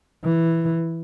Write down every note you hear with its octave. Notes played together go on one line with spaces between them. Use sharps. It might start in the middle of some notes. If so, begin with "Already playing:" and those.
E3